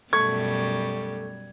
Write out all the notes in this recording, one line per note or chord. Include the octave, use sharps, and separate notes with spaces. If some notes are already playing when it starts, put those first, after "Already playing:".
F#2 B2 G3 A3 C#6 G#6